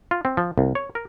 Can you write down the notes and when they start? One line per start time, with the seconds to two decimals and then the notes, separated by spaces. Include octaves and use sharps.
0.11 F4
0.25 C4
0.37 F3
0.58 C2
0.75 C#5
0.95 A#4